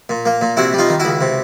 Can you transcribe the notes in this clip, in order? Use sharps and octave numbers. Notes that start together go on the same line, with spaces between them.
A#2
A#3
A#2
C3 E4 F#4
G3
D#4 F4
D#3
E4 F#4
C#2
C3